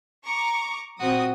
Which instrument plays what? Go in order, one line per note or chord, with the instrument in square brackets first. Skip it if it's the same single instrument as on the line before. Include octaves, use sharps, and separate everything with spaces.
[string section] A#5 C#6 D6
[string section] A#2 F#3 D#6 [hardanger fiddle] C4 F#4